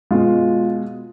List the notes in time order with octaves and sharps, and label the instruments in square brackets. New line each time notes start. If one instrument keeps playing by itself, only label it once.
[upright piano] B2 G#3 F4